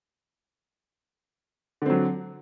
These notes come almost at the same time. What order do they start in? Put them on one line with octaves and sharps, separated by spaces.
D3 C4 F#3